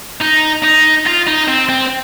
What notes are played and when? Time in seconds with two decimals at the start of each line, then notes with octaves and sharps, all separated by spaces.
0.21 D#4
0.62 D#4
1.06 F4
1.27 D#4
1.48 C4
1.69 C4